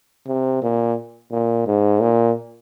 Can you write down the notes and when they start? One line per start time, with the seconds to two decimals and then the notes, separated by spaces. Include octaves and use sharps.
0.28 C3
0.63 A#2
1.32 A#2
1.67 G#2
2.01 A#2